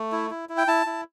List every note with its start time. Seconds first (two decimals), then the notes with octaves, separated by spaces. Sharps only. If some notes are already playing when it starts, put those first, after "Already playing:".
Already playing: A3
0.12 E4
0.31 E4
0.49 E4
0.58 G5
0.67 E4 A5
0.86 E4